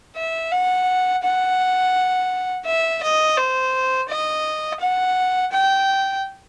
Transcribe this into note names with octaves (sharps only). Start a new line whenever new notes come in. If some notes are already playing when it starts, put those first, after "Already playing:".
E5
F#5
F#5
E5
D#5
C5
D#5
F#5
G5